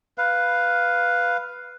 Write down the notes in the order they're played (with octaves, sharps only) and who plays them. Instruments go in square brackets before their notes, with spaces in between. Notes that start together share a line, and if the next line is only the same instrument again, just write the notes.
[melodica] B4 F5